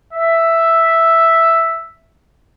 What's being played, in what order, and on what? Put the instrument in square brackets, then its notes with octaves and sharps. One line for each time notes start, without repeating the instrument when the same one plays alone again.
[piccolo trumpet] E5